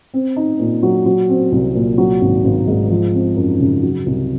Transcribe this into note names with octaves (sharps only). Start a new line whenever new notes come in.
C4
D#4
A#2
F#3
F#3
C4
C2
A#2
F#3
G#1
G#1
G#2
F3
C4
F#2
C#3
F#3
C2